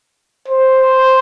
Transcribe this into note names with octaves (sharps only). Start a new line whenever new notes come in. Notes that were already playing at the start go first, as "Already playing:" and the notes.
C5